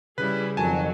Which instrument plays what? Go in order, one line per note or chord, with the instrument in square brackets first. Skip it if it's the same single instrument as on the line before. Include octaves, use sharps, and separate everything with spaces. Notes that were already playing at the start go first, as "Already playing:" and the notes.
[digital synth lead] C#3 [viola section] G3 E4 G#4 [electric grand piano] B4
[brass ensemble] F2 D#3 [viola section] F#3 [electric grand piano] G#5 A5